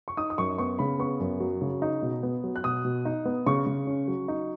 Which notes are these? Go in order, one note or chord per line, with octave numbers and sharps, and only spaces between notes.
C#6
D#4 D#6
D#6
F#2 C#6
B3 C#6
C#3 B5
B3 C#6
F#2
F#3
C#3
D#4
B2
B3
F#3
F#6
B2 D#6
B2
D#4
B3
C#3 C#6
C#3
C#4
F#3
D#4